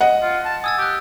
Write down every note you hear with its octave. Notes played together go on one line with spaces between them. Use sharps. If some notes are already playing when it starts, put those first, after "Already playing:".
D#5 F#5
F4
A5
G#5 D#6 E6 A6
G4 D6 F#6